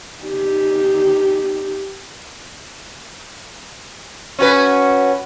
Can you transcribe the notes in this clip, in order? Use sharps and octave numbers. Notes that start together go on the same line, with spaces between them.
D#4 G4
C#4 F#4 B4